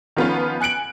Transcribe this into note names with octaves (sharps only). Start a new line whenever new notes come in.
D#3 F3 B3 C#4 F4
G#5 F#6 C#7 D7 F#7